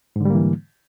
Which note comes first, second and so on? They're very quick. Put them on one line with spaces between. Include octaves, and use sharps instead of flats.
G#2 D3 G3 A#3 E3